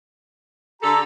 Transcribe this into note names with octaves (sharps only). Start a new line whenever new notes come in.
D3 G4 A4 A#5